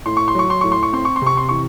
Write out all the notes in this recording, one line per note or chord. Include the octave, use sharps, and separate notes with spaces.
A2 C6
C#6
C6
F#3 C#6
C6
A2 C#6
C6
C#6
C4 C6
C#6
C6
C3 C#6
C6
E3 C#6